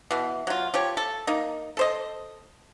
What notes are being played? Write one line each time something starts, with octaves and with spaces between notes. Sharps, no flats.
B2 E3
F#3 F4
F3 G4 C#5
A4
A#3 D#4
A4 C5 D#5